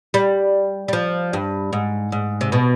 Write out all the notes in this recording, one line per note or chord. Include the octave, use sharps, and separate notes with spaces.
G3
G3
F3
G2
G#2
G#2
C3
B2